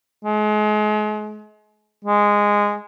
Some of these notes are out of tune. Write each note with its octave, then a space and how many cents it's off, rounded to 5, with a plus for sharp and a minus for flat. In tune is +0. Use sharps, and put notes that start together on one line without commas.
G#3 +35
G#3 -10